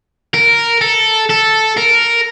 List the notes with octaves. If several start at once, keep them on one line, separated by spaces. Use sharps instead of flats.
A#4
A4
A4
A#4